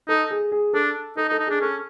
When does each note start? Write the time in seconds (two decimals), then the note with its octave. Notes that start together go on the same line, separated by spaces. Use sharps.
0.08 D#4 A4
0.31 G#4
0.52 G#4
0.73 D4 A4
1.17 D#4 A4
1.29 D#4
1.31 A4
1.39 D#4
1.47 D4 G#4
1.61 C#4 A4